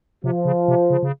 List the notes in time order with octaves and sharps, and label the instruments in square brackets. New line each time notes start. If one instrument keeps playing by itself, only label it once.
[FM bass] C3 [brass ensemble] F3
[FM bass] C#3
C3
C#3
C#3